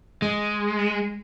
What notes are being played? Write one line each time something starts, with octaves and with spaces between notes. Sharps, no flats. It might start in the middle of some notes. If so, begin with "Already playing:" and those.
G#3